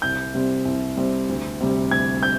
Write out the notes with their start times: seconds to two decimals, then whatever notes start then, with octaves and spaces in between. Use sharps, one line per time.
0.02 C2 G6
0.34 C3 G3 C4
0.65 C2
0.97 C3 G3 C4
1.29 D2
1.60 C3 G3
1.91 D2 G#6
2.23 G6